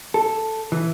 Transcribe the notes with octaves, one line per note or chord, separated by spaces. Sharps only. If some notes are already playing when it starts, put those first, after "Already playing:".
A4
E3